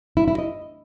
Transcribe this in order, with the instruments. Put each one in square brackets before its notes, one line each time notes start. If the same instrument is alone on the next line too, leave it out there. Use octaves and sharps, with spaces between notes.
[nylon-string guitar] E4
E4
D#5